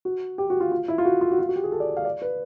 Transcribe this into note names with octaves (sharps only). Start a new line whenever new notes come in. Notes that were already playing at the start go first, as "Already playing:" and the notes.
F#4
G4
F#4
F4
F4
E4
F4
F#4
F4
F#4
F4
F#4
G4
G#4
A4
D5
F5
D5
B4